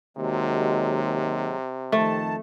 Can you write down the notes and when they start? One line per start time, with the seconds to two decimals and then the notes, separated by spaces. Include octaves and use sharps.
0.17 D#2 C3 F#3 G#3
1.92 F2 D#3 A3 A5